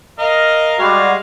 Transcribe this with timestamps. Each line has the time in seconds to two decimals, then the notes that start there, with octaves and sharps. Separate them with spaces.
0.19 A#4 D#5 F5
0.79 G3 G#3 F#4 F5